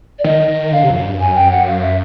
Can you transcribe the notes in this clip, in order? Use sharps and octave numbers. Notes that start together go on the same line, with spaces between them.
D5
D#3 D#5
D#3
D3 F5
C3
F2
F#2
G2
F#2 G#5
G5
F#5
F5
E5